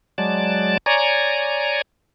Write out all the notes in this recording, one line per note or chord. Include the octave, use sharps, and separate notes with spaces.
F#3 G#3 D5 A5
C#5 D5 G#5 A#5